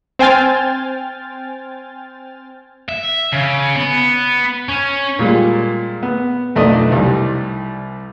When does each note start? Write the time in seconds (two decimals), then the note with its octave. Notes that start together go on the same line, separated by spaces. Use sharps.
0.19 C4 C5 G5 G#5 F6 A6
2.89 E5
3.32 C#3
3.76 B3
4.69 C#4
5.19 A#2 G3 G#3
6.03 B3
6.55 B1 F2 A3 D4 D5 D#5
6.92 C2 G3